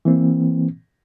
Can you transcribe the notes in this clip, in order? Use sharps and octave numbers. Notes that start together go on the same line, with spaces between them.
E3 A#3 C4